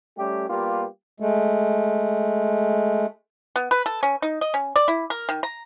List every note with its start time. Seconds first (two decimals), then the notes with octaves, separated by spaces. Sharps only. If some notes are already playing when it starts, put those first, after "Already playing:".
0.18 G3 A3 C#4 G4
0.50 G3 A#3 B3 F4 G4
1.20 G#3 A3
3.56 B3
3.71 B4
3.86 A4
4.03 C#4
4.22 D#4
4.41 D#5
4.54 C#4
4.76 D5
4.88 E4
5.10 A#4
5.29 D#3
5.43 A#5